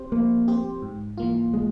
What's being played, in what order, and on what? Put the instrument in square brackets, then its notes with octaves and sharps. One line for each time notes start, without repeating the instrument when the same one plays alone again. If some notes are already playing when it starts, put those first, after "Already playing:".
Already playing: [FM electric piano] C4 G4 C5
[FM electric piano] F3 [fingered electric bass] A#3
[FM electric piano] C4 G4 C5
G#2
E3 A#3 F4
[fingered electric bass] G#3